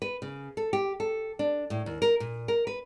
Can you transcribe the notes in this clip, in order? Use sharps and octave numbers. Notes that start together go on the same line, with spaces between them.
B4
C#3
A4
G4
A4
D4
A2
D#2
A#4
A#2
A#4
B4